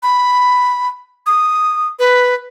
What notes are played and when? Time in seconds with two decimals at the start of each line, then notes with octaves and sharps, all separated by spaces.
0.03 B5
1.27 D#6
1.99 B4